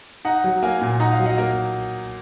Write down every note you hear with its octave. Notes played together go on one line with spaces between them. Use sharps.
D#4 F#5 A#5
F#3
A#3 F5 G#5
A#2
D#4 F#5 A#5
F5
F#3
D#5 F#5
A#3